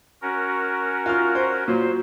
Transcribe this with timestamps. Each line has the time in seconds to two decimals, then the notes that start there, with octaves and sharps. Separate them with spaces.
0.22 C#4 F#4 A#4
1.06 F4 F6
1.35 C5
1.68 A#2 F#3 C5